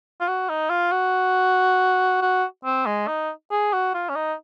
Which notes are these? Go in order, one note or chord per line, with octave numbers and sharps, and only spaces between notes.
F4
F#4
D#4
F4
F#4
F#4
C4
G#3
D#4
G#4
F#4
F4
C#4
D#4